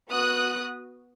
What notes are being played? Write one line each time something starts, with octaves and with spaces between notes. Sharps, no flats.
B3 F#4 D#6 F#6